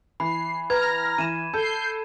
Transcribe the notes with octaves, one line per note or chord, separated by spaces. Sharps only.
E3 B5 C7
B4 A#5 F6 G#6 A#6
E3 D#7 E7
A4 G6 C7